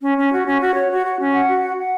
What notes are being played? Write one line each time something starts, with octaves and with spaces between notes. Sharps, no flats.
C#4
C#4
F#4
C#4
F#4
C#5
F#4
F#4
C#4
F#5
F#4
F#5
F#5